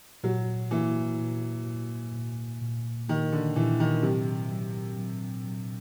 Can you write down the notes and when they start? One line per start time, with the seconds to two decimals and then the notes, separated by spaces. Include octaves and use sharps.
0.23 A#2 F#3
0.71 E3 A#3
1.19 A#2
1.67 A#2
2.14 A#2
2.62 A#2
3.08 D#3 A#3
3.32 D3
3.56 A#2 E3
3.80 D#3
4.03 C3 F#3
4.52 F#3
4.98 F#3
5.46 F#3